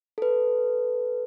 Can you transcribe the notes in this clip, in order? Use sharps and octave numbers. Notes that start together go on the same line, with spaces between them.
A4 B4